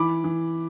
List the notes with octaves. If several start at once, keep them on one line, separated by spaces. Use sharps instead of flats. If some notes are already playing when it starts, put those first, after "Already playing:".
Already playing: E3 B5 D6
E3